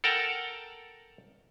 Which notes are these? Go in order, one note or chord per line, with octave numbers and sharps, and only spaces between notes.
A4 A#4 F#5 G5 A5 A#5